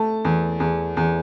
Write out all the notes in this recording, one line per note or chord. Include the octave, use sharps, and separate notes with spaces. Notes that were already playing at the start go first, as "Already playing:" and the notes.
Already playing: A3 A5
E2
E2
E2